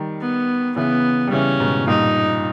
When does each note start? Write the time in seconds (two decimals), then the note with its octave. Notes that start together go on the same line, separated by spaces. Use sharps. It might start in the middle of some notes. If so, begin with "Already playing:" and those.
Already playing: D#3 G3
0.21 B3
0.76 C#3 E3 B3
1.27 G3
1.32 C#3 E3 C#4
1.60 G#2 B2
1.87 G2 A#2 D#4